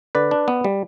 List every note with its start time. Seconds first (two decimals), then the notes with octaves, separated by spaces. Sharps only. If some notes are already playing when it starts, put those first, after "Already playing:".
0.15 D3 B4 D5
0.31 D4
0.48 B3
0.64 G3